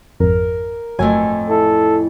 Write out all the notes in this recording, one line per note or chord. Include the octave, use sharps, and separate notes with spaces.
G#1 F2 A#4
G1 F2 A2 F#3 G#5
E4 A4